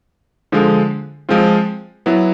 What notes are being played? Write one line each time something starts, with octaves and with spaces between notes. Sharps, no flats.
D3 F3 G#3
F3 G#3 C4 F4
F#3 B3 E4